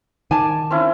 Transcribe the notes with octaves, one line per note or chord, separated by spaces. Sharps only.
D#3 D5 G#5 A5
C4 C#4 E4